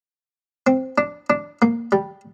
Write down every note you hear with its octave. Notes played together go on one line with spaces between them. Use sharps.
C4
D4
D4
A#3
G3